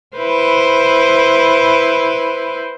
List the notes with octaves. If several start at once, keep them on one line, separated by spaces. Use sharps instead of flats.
E4 B4 C5